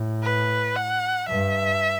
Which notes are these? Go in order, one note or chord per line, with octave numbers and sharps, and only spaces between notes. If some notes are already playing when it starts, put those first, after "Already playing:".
Already playing: A2
B4
F#5
G2 E5